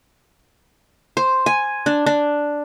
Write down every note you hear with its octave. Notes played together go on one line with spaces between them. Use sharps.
C5
G#5
D4
D4